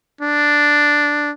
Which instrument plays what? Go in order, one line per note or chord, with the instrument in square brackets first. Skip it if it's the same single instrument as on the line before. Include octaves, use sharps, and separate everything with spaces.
[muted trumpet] D4